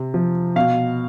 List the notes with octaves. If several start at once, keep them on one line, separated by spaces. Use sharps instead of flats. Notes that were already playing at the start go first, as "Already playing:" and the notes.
Already playing: C3
F3
B2 F5